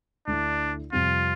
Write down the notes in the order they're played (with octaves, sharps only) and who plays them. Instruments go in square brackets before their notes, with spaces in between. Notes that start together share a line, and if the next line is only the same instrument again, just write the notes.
[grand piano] D2 D3 A3 E4 [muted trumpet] D4
[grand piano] F2 C3 G3 C4 [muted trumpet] F4